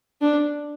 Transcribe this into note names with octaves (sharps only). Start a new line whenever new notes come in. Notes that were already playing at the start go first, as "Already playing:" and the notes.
D4